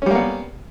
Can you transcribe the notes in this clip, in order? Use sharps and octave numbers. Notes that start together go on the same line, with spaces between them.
G3 A#3 B3 C#4